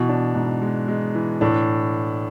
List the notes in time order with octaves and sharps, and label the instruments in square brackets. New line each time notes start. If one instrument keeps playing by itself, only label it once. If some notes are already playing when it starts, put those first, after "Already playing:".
Already playing: [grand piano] B2 [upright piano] E3
[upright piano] D4
G#2
G#3
G#3
E3
[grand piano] A2 [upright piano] D4